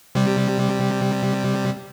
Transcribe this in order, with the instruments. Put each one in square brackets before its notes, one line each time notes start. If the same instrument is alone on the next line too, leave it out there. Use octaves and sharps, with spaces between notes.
[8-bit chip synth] C3 G3